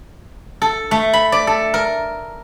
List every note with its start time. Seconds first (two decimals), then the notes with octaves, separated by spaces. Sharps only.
0.62 A4
0.91 A3
1.13 B5
1.32 D5
1.47 A4
1.74 A#4